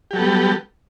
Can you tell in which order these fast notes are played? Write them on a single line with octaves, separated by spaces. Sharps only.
G4 F#3 A4 B3 G3